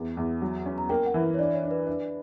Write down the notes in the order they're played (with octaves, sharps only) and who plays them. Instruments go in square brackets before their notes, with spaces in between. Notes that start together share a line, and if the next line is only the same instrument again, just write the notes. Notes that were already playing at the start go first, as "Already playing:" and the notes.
Already playing: [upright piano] E2
E2
F#3
C#4
[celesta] A#5
[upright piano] A#3 [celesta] G5
[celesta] F#5
[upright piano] E3
[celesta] C#5
[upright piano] D4 [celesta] D5
[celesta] C#5
[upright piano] D4
[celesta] B4
[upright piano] D4